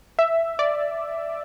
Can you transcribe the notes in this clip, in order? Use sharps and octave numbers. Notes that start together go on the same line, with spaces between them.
E5
D5